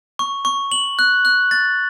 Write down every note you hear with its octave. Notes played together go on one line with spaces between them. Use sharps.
C#6
C#6
F#7
F#6
F#6
A6